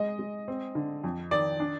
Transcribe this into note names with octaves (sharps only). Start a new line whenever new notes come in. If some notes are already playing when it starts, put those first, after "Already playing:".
Already playing: G#3 D#5
G#3
C4
D3
F2
D#3 D5
D4